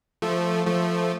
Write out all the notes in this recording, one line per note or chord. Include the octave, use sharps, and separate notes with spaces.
F3 A3
F3 A3